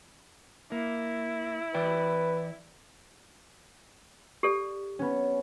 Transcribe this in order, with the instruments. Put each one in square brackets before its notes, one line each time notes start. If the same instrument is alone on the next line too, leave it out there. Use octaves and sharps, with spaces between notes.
[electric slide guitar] A#3 [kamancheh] E4
[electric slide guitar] E3 D5 G5 [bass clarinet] B4
[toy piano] G4 A4 D5
[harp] B3 C#4